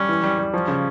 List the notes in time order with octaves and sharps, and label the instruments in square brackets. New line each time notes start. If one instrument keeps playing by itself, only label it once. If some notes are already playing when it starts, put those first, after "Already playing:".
Already playing: [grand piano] G3 [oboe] C#4
[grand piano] E3
G3
G3
[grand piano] F3 [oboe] C#4
[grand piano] C#3